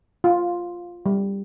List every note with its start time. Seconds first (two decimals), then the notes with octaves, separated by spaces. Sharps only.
0.24 F4
1.06 G3